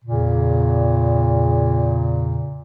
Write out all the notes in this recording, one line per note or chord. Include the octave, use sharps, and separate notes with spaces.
E2 A#2 C#3